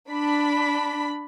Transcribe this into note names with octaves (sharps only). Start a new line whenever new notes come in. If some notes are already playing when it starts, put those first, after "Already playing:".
D4 B5 B6